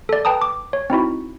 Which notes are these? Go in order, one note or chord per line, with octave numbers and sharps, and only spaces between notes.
A4 D5
B4 G5 A5 A#5 D#6
D6
C#5
C4 D#4 E4 F#4